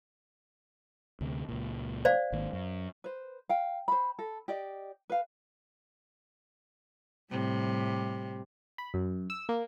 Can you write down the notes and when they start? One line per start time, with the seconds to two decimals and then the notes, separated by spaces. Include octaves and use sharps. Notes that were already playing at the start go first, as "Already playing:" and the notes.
1.21 D2 C3
1.49 C#2 A#2
2.05 C5 D5 F5
2.32 G#1 D#3 A#3
2.53 F#2
3.04 B4 C5
3.49 F5 G5
3.88 C5 B5
4.19 A4
4.48 G4 D5 D#5
5.10 B4 F5
7.30 A2 C3 G3
8.78 B5
8.94 F#2
9.30 E6
9.49 A#3